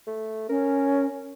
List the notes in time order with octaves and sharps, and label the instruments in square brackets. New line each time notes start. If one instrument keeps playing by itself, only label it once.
[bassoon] A3
[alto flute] C#4 [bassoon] A#4